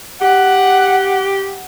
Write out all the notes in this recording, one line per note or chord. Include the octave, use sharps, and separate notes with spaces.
G4 F#5